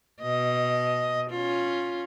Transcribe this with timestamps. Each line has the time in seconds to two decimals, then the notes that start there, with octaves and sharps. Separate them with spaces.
0.21 B2 D#5
1.31 C#4 F4